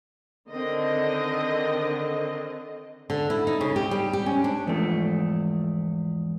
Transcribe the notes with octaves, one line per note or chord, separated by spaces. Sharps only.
D3 D#3 C4 D#5
D3
E4
D#4
C#3
G4
G3
G4
C#4
D4
E2 G#2 F3 A3